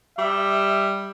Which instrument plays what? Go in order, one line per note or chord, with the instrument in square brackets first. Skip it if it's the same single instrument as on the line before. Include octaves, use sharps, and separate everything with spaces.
[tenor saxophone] G3 [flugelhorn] E5